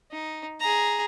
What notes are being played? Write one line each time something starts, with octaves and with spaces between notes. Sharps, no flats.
D#4
G#4 A#5